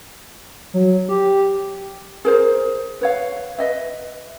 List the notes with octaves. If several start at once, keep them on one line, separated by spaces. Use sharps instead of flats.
F#3
G4
G#4 A#4 C5
B4 C#5 F5
B4 D#5 E5